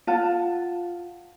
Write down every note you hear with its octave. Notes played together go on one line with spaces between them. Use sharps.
F4 F#5 A5